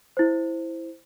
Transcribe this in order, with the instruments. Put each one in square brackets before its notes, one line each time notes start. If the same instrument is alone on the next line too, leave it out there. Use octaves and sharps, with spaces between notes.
[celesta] E4 C5